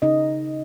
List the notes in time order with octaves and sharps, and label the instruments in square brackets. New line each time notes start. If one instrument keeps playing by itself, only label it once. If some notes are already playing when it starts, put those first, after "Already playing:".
[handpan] C#3 D#4 D#5